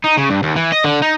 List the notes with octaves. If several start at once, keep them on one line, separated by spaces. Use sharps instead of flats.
D#4
C#3
G2
D#2
E3
D#5
D3
D#4